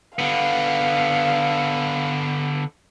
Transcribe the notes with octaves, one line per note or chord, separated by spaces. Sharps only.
D3 B3 F5